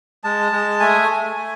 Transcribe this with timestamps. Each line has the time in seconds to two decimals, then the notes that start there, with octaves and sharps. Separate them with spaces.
0.24 G#3 A5
0.52 G#3
0.80 A3 G#5
1.08 A3
1.36 A3